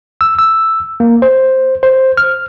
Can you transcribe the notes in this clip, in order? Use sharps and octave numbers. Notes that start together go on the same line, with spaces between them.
E6
E6
A#3
C5
C5
F6